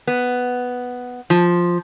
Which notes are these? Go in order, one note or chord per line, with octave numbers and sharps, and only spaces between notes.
B3
F3